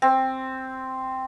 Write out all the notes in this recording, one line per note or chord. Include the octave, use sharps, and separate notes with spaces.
C4